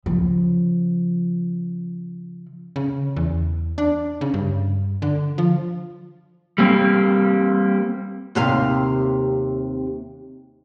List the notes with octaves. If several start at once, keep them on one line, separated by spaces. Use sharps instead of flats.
C#3 F3
C#3
E2
D4
C#3
G2
D3
F3
G3 A#3 C4
D#2 C3 F5